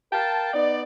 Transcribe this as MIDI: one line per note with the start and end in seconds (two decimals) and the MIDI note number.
0.13 0.53 70
0.13 0.53 77
0.13 0.53 79
0.13 0.53 81
0.54 0.82 59
0.54 0.82 63
0.54 0.82 74